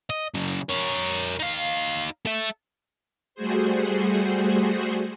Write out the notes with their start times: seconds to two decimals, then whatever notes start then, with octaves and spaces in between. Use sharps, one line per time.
0.10 D#5
0.35 C#3 F#3
0.69 A#4 C#5
1.40 D#4 F5
2.26 A4 E5
3.35 G3 A3 F#4 G#4 C5